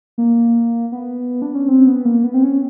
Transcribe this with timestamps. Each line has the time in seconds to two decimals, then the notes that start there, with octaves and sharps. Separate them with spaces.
0.18 A#3
0.92 B3
1.42 D4
1.55 C#4
1.68 C4
1.87 B3
2.05 A#3
2.24 B3
2.34 C4
2.43 C#4